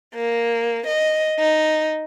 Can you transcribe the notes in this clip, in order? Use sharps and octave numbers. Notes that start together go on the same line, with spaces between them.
A#3
D#5
D#4